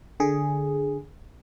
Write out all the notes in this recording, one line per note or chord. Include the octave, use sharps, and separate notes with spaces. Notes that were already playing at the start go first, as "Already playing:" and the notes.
D3 G#4